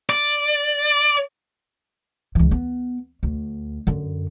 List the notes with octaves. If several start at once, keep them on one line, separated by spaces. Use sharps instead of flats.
D5
C#2 E3
B3
D2
F#2 D3